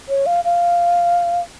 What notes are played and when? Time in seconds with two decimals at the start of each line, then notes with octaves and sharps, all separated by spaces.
0.09 C#5
0.26 F5
0.45 F5